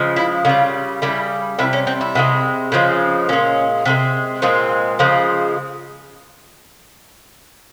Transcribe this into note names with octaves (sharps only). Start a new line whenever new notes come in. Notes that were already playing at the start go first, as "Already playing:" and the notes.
Already playing: C#3 F3 G#3
E4
C#3 G3 F4
C#3 G3 E4
C3 G3 E4
C#4
C4
E4
C3 E3 G#3
C#3 F3 G#3
A#2 G#3 C#4
C3 E3 G#3
A#2 G#3 C4
C#3 F3 G#3